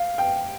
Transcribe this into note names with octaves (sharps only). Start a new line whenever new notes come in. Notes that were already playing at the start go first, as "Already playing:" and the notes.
Already playing: F5
G5